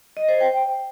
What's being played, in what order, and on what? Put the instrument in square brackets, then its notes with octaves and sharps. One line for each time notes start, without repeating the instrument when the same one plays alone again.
[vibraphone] D#5
C5
G5